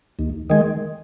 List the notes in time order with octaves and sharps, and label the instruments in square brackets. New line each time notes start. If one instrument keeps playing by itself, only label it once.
[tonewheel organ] D#2
D#3 G#3